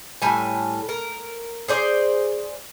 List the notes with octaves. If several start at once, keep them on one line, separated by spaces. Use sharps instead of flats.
A2 G3 G#5
A#4
G#4 C5 D5